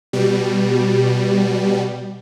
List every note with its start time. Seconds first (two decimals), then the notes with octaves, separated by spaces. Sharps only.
0.13 B2 G3